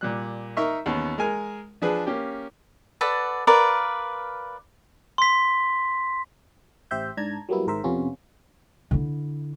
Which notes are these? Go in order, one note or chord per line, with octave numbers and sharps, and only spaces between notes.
A#2 G3 F#6
D#4 A#4 E5 C#6
D#2 B3 C#4
G#3 A#4 G#5 F6
F3 D4 G#4 B4
A#3 C#4 G4
A4 B4 D5 F#5
F4 A#4 B4 D5
C6 B6
A1 G4 C5 E5 G6
G#2 D4 A5 A#5 G#6
F#3 G3 A#3 B3 E4
G#1 G#2 A#4 C5 E5
F2 C3 B3 C#4 F4
D3 E4